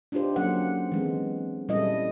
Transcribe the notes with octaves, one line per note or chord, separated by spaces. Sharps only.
D4 D#4 F4 G4 C5
F#3 A#3 C#4 A4 C5 F#5
E3 G#3 C4
A#2 G3 C#4 E4 A4 D#5